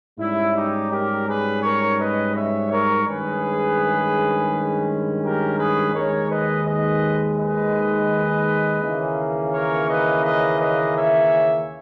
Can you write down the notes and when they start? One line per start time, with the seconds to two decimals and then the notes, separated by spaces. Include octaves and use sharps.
0.18 G#2 G3 C#4 E4
0.55 D#4 G4
0.91 G4 A#4
1.27 G#4 B4
1.62 A#4 C#5
1.99 B4 D#5
2.35 C#5 E5
2.70 A#4 C#5
3.06 G2 D#3 G#3 C#4 G#4 B4
5.22 G4 A#4
5.57 G#4 B4
5.93 D#2 D#3 G#3 A#4 C#5
6.29 B4 D#5
6.65 B4 D#5
7.37 B4 D#5
8.81 D#2 C#3 E3 A#3 C#4
9.52 A#4 C#5
9.88 B4 D#5
10.24 B4 D#5
10.60 B4 D#5
10.96 C#5 E5